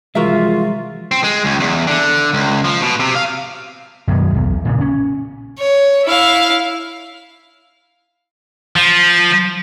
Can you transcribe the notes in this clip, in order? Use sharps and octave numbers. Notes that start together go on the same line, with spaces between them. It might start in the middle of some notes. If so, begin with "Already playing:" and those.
C2 E3 F3 G#3 F4 F#4 A#4 E5
C4
G#3
C#2
E2
D3
C#2
F3
B2
C3
F5
F#2 B2 D#3 G#3
B1 E2
A#2 C#3
C#4
C#5
E4 F5
F3